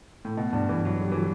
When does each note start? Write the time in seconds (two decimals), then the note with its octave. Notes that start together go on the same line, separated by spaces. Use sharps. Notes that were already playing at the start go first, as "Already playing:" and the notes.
0.25 A2
0.37 B2
0.53 G2
0.69 E3
0.85 F#3
1.01 G3
1.12 E3
1.17 F#3